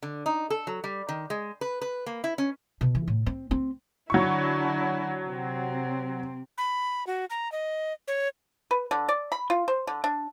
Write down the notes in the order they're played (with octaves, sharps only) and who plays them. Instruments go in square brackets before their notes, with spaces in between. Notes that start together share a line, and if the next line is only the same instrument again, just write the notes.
[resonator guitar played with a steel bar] D3
D#4
A4
F#3
G3
D#3
G#3
B4
B4
A#3
E4
C#4
[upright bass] B2
E3
A2
C4
C4
[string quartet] D3 D4 E4 [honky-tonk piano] F#3 C#6
[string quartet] C3 C4
[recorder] B5
F#4
A#5
D#5
C#5
[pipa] B4
D3
D5
B5
F4
C5
D3
D4